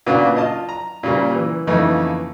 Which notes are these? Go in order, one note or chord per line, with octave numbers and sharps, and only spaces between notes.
A#2 C#3 A#3 B3 D4 F#4
F4 D#5 A5
A#5
A#2 C#3 G3 A#3
E3
F2 C#3 E3 A3 A#3 D#4